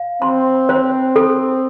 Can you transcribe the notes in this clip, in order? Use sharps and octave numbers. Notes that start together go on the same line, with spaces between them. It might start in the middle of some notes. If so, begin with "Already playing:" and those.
Already playing: F5
C4 C6
C5
A4